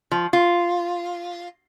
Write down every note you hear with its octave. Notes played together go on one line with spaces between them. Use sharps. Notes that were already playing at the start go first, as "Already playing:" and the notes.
F3
F4